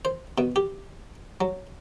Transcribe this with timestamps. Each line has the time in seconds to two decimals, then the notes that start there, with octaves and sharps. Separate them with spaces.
0.05 C5
0.38 B2
0.56 G4
1.41 F#3